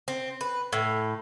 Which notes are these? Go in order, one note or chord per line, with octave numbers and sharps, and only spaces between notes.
C4
B4
A2